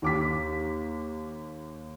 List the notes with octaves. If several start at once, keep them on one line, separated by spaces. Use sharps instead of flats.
D#2 D6 B6